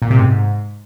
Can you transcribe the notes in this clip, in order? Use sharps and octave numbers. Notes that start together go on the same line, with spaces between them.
A#2
C3
G#2